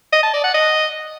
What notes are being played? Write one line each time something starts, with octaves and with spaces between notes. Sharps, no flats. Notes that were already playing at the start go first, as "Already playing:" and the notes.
D#5
A5
D5
F#5
D#5